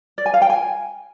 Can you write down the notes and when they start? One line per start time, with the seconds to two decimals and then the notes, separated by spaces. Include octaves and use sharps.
0.18 D5
0.26 G#5
0.34 F5
0.42 G5
0.50 G#5